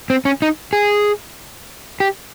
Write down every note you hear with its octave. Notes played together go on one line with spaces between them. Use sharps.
C4
C#4
D#4
G#4
G4